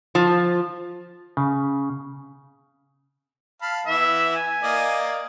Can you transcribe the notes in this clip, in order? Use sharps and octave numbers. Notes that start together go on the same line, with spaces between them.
F3
C#3
F5 A5 B5
E3 B3 E5
G#5
A#3 D5 D#5